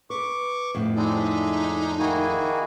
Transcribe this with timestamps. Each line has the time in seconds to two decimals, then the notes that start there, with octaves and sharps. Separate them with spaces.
0.10 B4 C#6 D6
0.75 F2 A2 D3 B3
0.96 G3 G#3 C4 D4 D#4 G#4
1.19 G#3 E5
1.99 D#3 A#3 E4 F#4 G#4 G#5